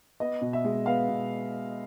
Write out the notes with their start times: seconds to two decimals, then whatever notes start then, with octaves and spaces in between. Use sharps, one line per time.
0.20 B3 D#5
0.41 B2
0.53 E5
0.65 G#3
0.86 B3 F5
1.09 B2